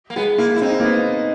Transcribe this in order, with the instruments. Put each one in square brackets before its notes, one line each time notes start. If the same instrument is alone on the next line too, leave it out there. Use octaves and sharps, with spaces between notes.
[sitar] A#3
[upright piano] G#3 [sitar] B3
[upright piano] A#3 [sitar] E4
[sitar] E4
[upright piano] C4 [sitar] D#4
[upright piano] A#3
B3